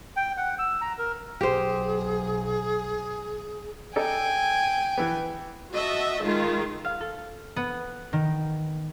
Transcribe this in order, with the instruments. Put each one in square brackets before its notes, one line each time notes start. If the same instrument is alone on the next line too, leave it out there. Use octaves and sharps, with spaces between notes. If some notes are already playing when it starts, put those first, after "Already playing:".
[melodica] G5
F#5
E6
A#5
A#4
[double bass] B1 [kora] G4 C5 [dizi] G#4
[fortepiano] D#4 A4 D5 [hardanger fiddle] G5 G#5
[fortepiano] E3 B3
[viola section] F#4 D#5 E5 A5
D#3 G#3 F4
[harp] F5
A4
B3
D#3